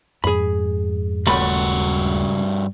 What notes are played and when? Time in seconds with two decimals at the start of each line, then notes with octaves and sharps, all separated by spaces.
0.24 F2 G#2 G#4 B5
1.27 D#1 C#2 G2 A3 F#4 B5